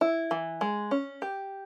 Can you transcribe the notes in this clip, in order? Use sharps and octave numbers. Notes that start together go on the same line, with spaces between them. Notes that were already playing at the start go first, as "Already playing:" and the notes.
E4
E3
G#3
C#4
G4